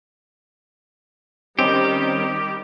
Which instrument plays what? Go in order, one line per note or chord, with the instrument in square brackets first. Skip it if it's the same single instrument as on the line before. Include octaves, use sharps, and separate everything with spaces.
[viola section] D#3 G3 [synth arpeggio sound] C4 C#4 [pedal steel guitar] G4 [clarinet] D#5